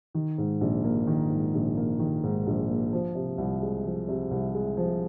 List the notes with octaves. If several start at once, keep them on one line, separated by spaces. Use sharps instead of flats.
D#3
G#2
A#1
A#3
D#3
G#2
A#1
A#3
D#3
G#2
A#1
A#3
F3
C3
C2
G#3
F3
C3
C2
G#3
F3